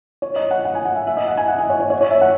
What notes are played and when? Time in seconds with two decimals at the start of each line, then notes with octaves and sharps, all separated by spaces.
0.22 C#5
0.36 D#5
0.51 F#5
0.65 F#5
0.75 G#5
0.85 F#5
0.96 E5
1.07 E5
1.17 D#5
1.27 F#5
1.37 G#5
1.48 F#5
1.58 D#5
1.70 C#5
1.80 C#5
1.90 C#5
2.01 C#5
2.11 E5
2.21 F#5